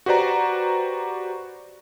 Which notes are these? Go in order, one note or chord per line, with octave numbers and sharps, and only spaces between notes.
F#4 G4 B4 C5 D5 A#5